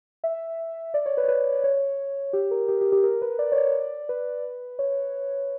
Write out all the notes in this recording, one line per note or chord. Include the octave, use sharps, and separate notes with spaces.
E5
D5
C#5
B4
C#5
B4
C#5
G4
A#4
G4
G4
G4
A#4
B4
D5
C#5
D5
B4
C#5